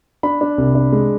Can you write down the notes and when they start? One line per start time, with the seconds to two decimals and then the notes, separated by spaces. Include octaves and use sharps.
0.23 D4 B5
0.41 D4
0.58 C2
0.75 D4
0.93 G#3